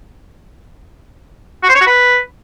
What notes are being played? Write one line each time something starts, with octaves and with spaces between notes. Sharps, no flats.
F#4
C5
C#5
F#4
B4